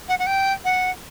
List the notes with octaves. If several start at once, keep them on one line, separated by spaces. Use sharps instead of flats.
F#5
F#5
G5
F#5